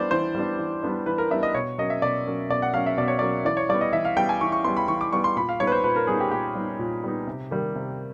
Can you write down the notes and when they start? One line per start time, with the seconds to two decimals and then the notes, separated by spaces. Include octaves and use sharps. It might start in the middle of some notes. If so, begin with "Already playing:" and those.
Already playing: E3 G3 B3 D4 C5 D5
0.11 E3 C5
0.35 G3 B3 D4
0.59 E3
0.83 G3 B3 D4
1.06 E3 B4
1.18 A#4
1.31 G3 B3 D4 E5
1.43 D#5
1.54 B2 C#5
1.78 F#3 A#3 C#4 D#5
1.90 E5
2.02 B2 D5
2.27 F#3 A#3 C#4
2.50 B2 D5
2.62 F#5
2.73 F#3 A#3 C#4 F5
2.86 E5
2.97 B2 D5
3.08 C#5
3.19 F#3 A#3 C#4 D5
3.45 E3 D5
3.57 C#5
3.69 G3 D5
3.74 B3
3.81 D#5
3.93 E3 E5
4.05 F5
4.16 G3 B3 G5
4.29 G#5
4.41 E3 C#6
4.52 C#6
4.64 G3 B3 C6
4.77 B5
4.88 E3 C#6
5.01 D6
5.12 G3 B3 C#6
5.24 C6
5.36 A#2 B5
5.49 F5
5.60 G3 B3 D#4 C#5
5.67 B4
5.72 C5
5.84 A#2 B4
5.96 A#4
6.07 G3 B3 D#4 G#4
6.20 G4
6.31 A#2 G4
6.55 G3 B3 D#4
6.79 A#2
7.04 G3 B3 D#4
7.27 C3
7.51 D#3 G3 A#3
7.75 C3